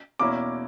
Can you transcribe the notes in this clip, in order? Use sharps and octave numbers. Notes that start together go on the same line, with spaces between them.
E2 B2 A#3 C#4 E4 D6